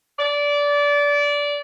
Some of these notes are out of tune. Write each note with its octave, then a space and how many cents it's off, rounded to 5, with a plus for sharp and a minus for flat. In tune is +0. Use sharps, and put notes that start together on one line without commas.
D5 -20